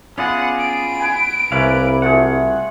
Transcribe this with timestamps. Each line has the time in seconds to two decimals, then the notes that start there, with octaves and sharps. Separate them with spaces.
0.18 B3 C#4 F4 G#4 D5 F#5
0.59 D7
1.00 B4 G#5
1.52 C2 A#3 C#4 E4 B4 D5 F5
2.02 A3 F4 G#4 F#5